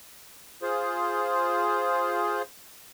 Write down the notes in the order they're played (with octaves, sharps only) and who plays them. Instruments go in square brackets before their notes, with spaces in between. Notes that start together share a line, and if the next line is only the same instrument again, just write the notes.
[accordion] F4 G#4 C5